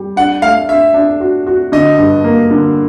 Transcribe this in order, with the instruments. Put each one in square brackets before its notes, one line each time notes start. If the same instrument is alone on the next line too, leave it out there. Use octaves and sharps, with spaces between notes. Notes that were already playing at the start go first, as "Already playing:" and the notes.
Already playing: [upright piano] G3
[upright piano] D4 [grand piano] F#5
[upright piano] A3 [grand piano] F5
[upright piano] D4 [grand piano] E5
[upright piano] D4
F#4
F#4
[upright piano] D3 [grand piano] D#5
[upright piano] G2
A#3
D3